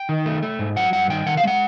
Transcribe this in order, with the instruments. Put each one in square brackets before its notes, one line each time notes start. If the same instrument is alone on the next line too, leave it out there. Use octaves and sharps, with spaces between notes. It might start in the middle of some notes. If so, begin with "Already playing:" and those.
Already playing: [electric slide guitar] G5
D#3
A3
A3
G#2
F#3 F#5
G2 F#5
D#3 G5
D#3 F#5
F5
G#3 F#5